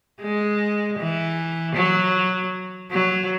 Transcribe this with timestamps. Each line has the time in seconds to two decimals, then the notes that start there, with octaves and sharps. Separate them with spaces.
0.21 G#3
0.99 E3
1.75 F#3
2.91 F#3